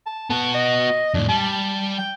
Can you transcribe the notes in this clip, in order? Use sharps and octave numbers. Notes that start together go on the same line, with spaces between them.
A5
B3 F#4 A5
D#5
F2 A2 D4
G3 A5
G5